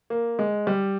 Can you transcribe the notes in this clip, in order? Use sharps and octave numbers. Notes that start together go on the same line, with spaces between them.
A#3
G#3
G3